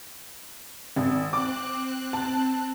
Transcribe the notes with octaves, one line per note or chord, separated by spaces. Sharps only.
G#1
C4 D6 F#6
A5